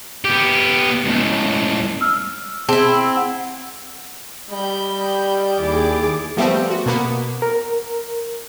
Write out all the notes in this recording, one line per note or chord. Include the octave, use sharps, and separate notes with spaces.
B3 G4
C#2 A2
E6 F6
C4 E4 G#4 A5 E7
F#5
G3 D#5 B5 G6
D#2 E4 G4 G#4 D5 D6
F3 G3 A3 B3 C4
F#4
B2 A#3 B3
A#4